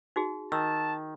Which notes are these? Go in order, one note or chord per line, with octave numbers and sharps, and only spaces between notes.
D#4 F#4 G#4
D#3 A5 E6